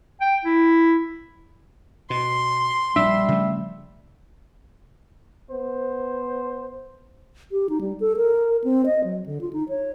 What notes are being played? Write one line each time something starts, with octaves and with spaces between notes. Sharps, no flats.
G5
E4
B2 C6
A#1 G3 D4 E5 E6
C#3 F3 A3
B3 C5
G4
D#4
G3
A4
A#4
C4
D#5
F#3
D3
F4
D#4
C#5